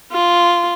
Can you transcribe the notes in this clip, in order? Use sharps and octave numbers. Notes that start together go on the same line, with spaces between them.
F4